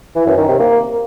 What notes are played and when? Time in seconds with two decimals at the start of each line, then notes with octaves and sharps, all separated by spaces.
0.16 E3
0.27 F#2
0.37 D#3
0.48 C3
0.59 A#3